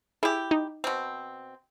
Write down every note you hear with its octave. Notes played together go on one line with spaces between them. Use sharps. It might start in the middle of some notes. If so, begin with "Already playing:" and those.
E4 G4 G#4
D#4
B2 C4